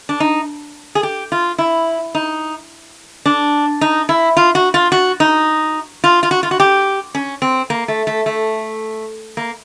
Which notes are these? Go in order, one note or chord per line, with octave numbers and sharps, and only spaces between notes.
D4
D#4
G#4
G4
F4
E4
D#4
D4
D#4
E4
F4
F#4
F4
F#4
D#4
F4
F4
F#4
F4
F#4
G4
C#4
C4
A#3
A3
A3
A3
A#3